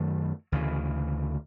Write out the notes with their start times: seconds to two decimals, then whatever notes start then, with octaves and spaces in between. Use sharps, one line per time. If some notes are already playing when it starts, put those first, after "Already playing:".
Already playing: F#2 D#3 F#3 A3
0.52 D2 C#3 E3